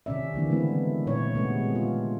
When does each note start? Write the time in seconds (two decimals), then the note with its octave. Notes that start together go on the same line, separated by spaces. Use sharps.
0.06 C3 D#3 C#4 D5 E5
0.34 D3 E3 A#3 D4
0.50 C#3 G#3 A3 B3 C4 E4
1.07 A#2 D#4 C#5
1.35 C3 G#3 A3 B3
1.75 F4